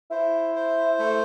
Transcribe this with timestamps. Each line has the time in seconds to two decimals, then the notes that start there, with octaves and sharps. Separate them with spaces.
0.10 E4 C5
0.55 C5
0.99 A3